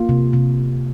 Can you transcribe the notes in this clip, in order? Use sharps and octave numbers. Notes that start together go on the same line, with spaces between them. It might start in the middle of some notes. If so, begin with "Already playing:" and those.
Already playing: A#3 F4
C3
C3